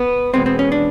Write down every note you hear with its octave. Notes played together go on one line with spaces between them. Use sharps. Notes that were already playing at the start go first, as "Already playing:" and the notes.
Already playing: B3
E2 B2 G#3 B3 C4
C4
C#4
D4